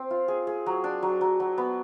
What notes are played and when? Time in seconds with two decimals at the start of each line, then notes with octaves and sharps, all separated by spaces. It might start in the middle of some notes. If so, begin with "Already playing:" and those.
Already playing: C4
0.10 F4
0.28 G#4
0.47 G#4
0.66 F#3
0.84 D4
1.02 F#3
1.21 F#3
1.40 F#3
1.58 B3